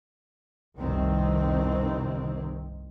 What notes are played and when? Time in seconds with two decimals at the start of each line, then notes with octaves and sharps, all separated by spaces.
0.76 F1 C2 G2 D#3 C4